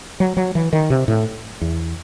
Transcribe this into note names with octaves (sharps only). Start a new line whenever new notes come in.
F#3
F#3
E3
D#3
C3
A2
E2